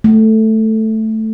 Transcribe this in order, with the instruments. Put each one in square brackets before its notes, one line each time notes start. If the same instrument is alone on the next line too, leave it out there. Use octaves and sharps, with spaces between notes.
[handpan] A3